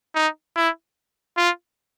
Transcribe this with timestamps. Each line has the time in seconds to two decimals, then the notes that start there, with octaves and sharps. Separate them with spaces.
0.15 D#4
0.56 E4
1.37 F4